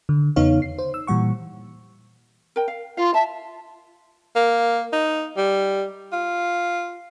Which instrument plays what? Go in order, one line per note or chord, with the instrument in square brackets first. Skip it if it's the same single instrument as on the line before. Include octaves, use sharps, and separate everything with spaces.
[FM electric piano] D3
E2 C#3 B3 D#4 C#5 F5
C7
C5
E6
A#2 E3 G3 F#5 C#6
[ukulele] A#4 G5
F5
[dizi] F4 [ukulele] F5
[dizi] E5 [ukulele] A5
[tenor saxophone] A#3
D#4
G3
F4